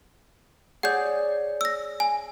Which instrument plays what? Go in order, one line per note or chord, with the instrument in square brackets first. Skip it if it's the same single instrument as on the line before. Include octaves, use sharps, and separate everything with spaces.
[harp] G#4 C#5 D5 [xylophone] F#5 G6
[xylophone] E6 A#6
G#5